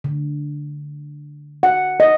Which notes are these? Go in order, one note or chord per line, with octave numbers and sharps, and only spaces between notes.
D3
F#5
D#5